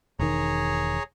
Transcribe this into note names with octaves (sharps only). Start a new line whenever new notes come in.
E1 D#3 G#4 C#5 A#5